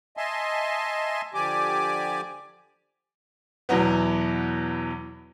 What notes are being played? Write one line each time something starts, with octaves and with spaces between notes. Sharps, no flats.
D#5 E5 G#5 A5 C6
D3 F3 G4 D5 G#5 D6
E2 B2 E3 F#3 B3